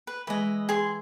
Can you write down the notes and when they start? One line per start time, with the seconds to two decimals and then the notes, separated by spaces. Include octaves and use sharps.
0.07 B4
0.27 E3 G#3 B4 D#5
0.69 G#4 C6